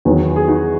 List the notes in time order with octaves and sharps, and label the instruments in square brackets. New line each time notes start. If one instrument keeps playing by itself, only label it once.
[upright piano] E2 D#3 F#3 B3
[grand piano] G#4
D#4 F#4